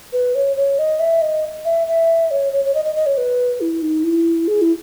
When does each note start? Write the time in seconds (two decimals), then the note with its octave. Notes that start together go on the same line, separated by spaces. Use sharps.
0.13 B4
0.35 C#5
0.56 C#5
0.79 D#5
1.00 E5
1.21 D#5
1.65 E5
1.87 E5
2.31 C#5
2.53 C#5
2.65 C#5
2.75 D#5
2.85 D#5
2.96 D#5
3.06 C#5
3.17 B4
3.61 E4
3.82 D#4
4.04 E4
4.48 G#4
4.62 E4